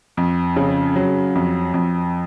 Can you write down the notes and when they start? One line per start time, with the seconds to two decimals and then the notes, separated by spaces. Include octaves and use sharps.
0.17 F2
0.56 C#3
0.96 F#3
1.35 F2
1.74 F2